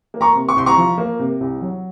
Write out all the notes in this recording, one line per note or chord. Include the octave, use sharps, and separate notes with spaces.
A#3
A#5 C#6
C3
C#6
C2 C6
A#5 C#6
F3
A#3
C3
C2
F#3